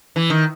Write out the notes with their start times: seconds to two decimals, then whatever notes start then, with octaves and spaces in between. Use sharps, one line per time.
0.16 E3
0.30 D#3